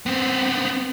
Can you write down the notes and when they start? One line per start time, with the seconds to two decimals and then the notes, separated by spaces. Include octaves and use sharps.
0.06 B3 C4